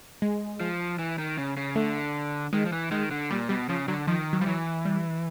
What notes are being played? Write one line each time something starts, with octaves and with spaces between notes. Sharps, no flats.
G#3
F3
E3
D#3
C#3
C#3
D3 A3
D#3 G#3
F3
E3
D#3 G#3
D3
A#2 G3
B2 G3
C#3 F3
D3 F#3
D#3 F3
F#3
F3 G3
E3 F#3
G3